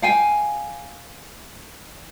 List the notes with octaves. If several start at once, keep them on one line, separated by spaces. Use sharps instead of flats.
F5 G5 G#5